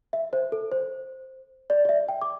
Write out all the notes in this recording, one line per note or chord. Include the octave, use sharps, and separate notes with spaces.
E5
C5
A4
C5
D5
D5
E5
G5
D6